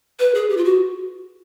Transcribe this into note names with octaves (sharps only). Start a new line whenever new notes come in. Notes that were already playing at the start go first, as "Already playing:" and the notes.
B4
G#4
G4
F4
F#4